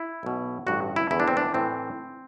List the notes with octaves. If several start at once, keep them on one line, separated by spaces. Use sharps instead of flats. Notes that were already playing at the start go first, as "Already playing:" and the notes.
Already playing: E4
B1 B2
A1 G2 D3 F#4
E4
E2 D3 E4
D4
C4
D4
A2 E3 C4